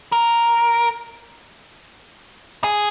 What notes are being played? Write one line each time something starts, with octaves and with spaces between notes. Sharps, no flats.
A#4
G#4